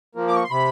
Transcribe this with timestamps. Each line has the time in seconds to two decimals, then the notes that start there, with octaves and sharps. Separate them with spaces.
0.15 F3 A#3
0.28 D6
0.35 C#6
0.44 C6
0.51 C3 B5